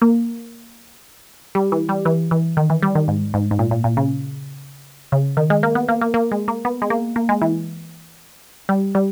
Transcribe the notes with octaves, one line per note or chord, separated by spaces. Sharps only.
A#3
G3
E3
G3
E3
E3
D#3
E3
G3
D#3
G#2
G#2
G#2
A#2
A#2
A#2
C#3
C#3
D#3
G#3
A#3
B3
A#3
A#3
A#3
G#3
A#3
B3
G#3
A#3
A#3
G#3
E3
G3
G3